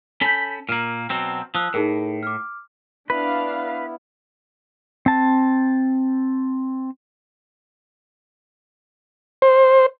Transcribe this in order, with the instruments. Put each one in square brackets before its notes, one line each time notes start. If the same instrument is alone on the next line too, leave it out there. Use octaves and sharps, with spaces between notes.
[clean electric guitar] C#4 A4 B5 [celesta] G6 B6 F#7
[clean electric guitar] A#2 A#3 [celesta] F6 F#7
[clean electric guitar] B2 F#3 C4
[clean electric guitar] F3 [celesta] D#6 E6 F#6
[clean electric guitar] A2 [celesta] D#4 G#4 A#4
[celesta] D6 F6
[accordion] B3 E4 [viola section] D4 F5 [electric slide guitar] B4
[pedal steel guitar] C4 A5
[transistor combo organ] C5